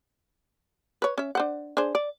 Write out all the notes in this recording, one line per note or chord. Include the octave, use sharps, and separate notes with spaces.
B4 C#5
C#4 E5
D4 C5 F#5
D4 G#4 C5
D5